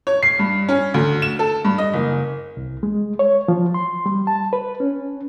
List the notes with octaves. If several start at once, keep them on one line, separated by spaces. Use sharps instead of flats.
C#5
C7
G2
C#4
D2
E7
A4
G2
D#5
F#1
C2
G#3
C#5
F3
C6
G3
A5
B4
C#4